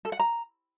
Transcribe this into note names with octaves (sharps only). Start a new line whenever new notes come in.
A4
F#5
A#5